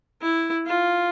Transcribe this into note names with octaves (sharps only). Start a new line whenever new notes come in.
E4
F4